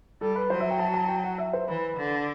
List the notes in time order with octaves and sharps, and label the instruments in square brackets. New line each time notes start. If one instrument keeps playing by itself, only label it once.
[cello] G3 [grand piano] A4
[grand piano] B4
[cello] F#3 [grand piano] C5
[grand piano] E5
G5
A5
A5
G5
F#5
E5
C5
[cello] E3 [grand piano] B4
[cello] D3